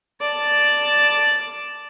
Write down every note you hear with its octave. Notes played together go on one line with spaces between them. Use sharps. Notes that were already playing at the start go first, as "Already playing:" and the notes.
D5 A5